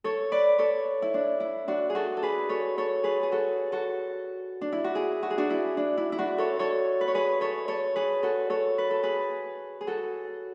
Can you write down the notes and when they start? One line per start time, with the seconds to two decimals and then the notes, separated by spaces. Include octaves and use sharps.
0.04 A4 C#5
0.32 B4 D5
0.58 A4 C#5
1.02 E4
1.14 D4
1.40 E4
1.68 D4 F#4
1.90 G#4
1.95 F#4 A4
2.17 A4
2.23 G#4 B4
2.49 A4 C#5
2.78 A4 C#5
3.04 G#4 B4
3.23 G#4
3.32 F#4 A4
3.72 F#4 A4
4.61 D4
4.72 E4
4.84 F#4
4.95 E4 G#4
5.23 F#4
5.30 G#4
5.38 D4 F#4
5.50 E4
5.77 D4
5.97 E4
6.12 E4
6.19 D4 F#4
6.38 A4 C#5
6.59 A4 C#5
7.01 B4
7.08 C#5
7.14 G#4 B4
7.41 A4 C#5
7.68 A4 C#5
7.96 G#4 B4
8.23 F#4 A4
8.50 A4 C#5
8.78 B4
8.91 A4
9.03 G#4 B4
9.81 G#4
9.87 F#4 A4